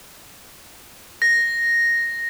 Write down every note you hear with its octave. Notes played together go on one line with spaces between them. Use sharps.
A#6